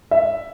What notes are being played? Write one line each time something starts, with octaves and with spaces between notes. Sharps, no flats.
E5